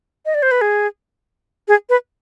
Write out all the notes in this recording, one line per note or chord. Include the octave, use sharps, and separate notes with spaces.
D#5
D5
C5
B4
G#4
G#4
B4